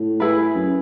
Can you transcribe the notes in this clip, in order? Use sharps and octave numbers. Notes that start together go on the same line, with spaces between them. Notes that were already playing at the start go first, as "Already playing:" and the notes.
Already playing: A2
E4 G#4 B4
F#2